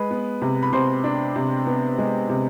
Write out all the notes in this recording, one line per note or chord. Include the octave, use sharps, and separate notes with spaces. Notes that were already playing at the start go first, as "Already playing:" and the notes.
Already playing: G#3 B4 B5
B3
C3
B5
C3 C5 C6
D4
C3
B3
G#3
C3